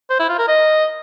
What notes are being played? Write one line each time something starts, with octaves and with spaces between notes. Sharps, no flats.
C5
E4
F4
A#4
D#5